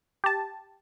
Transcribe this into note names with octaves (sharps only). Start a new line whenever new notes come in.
G4 A5